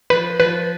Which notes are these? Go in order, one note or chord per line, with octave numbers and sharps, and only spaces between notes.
F3 B4
F3 B4